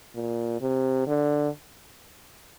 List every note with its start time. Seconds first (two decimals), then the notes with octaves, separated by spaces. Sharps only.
0.15 A#2
0.61 C3
1.07 D3